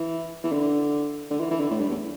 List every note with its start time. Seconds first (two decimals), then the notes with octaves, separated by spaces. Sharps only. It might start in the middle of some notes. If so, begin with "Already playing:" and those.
Already playing: E3
0.44 E3
0.52 D3
1.30 D3
1.41 E3
1.51 E3
1.60 D3
1.71 A2
1.81 G2
1.90 E2